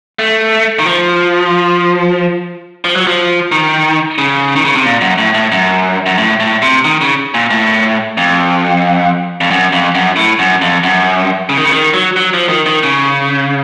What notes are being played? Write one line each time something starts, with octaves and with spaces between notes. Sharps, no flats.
A3
D#3
F3
F3
F#3
F3
D#3
C#3
D#3
C#3
C3
A#2
F#2
A2
A2
F#2
F#2
A2
A2
C3
D#3
C#3
A#2
A2
F2
F2
F#2
F2
F#2
A2
F#2
F2
F#2
C#3
D#3
C#3
D#3
F#3
F#3
F3
D#3
D#3
C#3